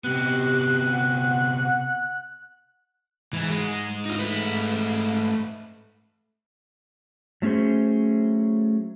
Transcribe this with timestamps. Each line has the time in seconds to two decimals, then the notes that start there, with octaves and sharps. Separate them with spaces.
0.04 C3 B3 G4 F#6
0.90 F#5
3.33 G#2 E3
3.50 G#3
4.05 D#4 F4
4.19 A3 B4
7.42 F#3 A3 C#4 G#4 C5